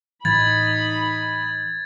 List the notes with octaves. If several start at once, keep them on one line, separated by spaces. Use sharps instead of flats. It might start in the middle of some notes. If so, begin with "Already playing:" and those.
A2 E3 D#4 B5 G#6 A6